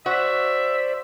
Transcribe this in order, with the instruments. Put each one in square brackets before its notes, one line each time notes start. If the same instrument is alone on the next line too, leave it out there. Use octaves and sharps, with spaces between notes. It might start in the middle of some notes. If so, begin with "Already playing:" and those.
[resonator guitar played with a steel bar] F#4 [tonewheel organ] C5 D5 [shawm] E5